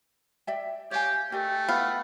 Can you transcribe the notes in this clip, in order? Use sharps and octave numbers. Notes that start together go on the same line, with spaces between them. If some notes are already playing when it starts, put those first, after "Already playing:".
D5 E5 G5
G4 C#5 F5 G#5
A3 G4 A#4 D#5 G5
B3 E4 F5